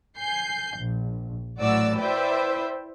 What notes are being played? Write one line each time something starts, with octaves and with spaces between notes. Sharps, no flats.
G#5 G6 C7
A#1
A2 E3 F#3 F#4 D5 E6
E4 B4 C5 D5 E5 G5